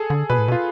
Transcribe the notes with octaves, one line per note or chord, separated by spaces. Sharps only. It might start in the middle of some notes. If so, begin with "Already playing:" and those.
Already playing: G#4 A4
D3
B2 B4
A2
B2
F4